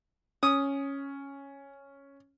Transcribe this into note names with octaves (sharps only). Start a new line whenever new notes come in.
C#4 D#6